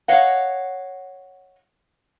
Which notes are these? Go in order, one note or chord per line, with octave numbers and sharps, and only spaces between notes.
C#5 D#5 F5 F#5